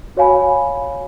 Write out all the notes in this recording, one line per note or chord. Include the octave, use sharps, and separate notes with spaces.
F#4 C#5 F5 G#5 B5